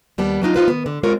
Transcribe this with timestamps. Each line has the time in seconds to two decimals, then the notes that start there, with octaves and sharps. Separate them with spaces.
0.18 D#2 G3 B3 A5
0.42 F#3 D4 D#4 F4
0.54 D#4 F4 B4 C5
0.68 D#3 B3
0.86 D3
1.03 G#3 C4 F4 G4 A#4 C#5